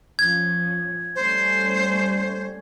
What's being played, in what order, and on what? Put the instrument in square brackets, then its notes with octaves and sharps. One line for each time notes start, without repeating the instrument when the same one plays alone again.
[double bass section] F3 C#4 [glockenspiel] G#6
[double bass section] G3 A3 C#4 [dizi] C5